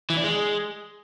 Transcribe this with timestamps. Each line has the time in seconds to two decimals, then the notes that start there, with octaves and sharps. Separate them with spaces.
0.10 E3
0.17 D4
0.24 G#3